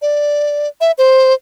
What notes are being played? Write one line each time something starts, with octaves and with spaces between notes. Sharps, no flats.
D5
E5
C5